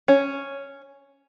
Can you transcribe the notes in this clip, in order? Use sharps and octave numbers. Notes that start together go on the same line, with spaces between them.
C#4